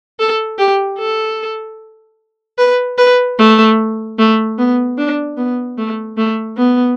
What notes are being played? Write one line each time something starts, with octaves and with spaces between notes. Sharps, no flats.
A4
G4
A4
B4
B4
A3
A3
B3
D4
B3
A3
A3
B3